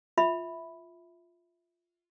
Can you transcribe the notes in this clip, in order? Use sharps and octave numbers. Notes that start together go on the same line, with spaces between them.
F4 E5 B5